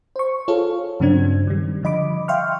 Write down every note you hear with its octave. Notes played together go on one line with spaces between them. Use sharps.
C5 C#6
F4 G#4 A4 C#5 F5
G2 C#3 F#3 C4 D4 G#6
D#3 G3
D3 F3 D#5 B5 D6
E5 F5 G5 C6 C#6 F6